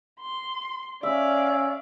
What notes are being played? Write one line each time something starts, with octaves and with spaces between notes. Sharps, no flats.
C6
C#4 D5 E5 F5